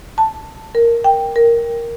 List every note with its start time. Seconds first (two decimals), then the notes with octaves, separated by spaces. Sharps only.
0.18 A5
0.75 A#4
1.04 G5
1.36 A#4